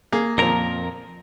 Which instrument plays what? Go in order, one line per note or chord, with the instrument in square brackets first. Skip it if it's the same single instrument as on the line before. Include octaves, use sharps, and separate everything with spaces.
[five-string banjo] A#3 [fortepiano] G#4
[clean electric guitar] F2 A#4 A#5 [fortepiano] A#2 F3